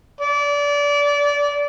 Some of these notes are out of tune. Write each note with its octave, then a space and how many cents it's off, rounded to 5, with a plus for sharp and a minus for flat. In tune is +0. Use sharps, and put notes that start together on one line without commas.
D5 -25